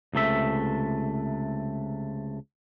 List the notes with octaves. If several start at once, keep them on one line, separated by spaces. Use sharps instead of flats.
C#2 C3 A3 E5